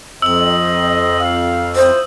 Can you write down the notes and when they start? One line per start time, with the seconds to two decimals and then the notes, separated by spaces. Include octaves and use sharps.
0.22 F2 C5 D#5 E6 F#7
1.20 F5
1.76 E4 F4 C5 D#6